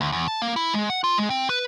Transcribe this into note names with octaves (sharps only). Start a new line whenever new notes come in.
D2
E2
A5
A#3
E4
G#3
F#5
F4
G#3
C4
B4